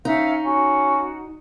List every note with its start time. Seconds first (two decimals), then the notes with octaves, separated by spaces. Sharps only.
0.05 C#4 D#4 E5 F5
0.45 C#4 F#4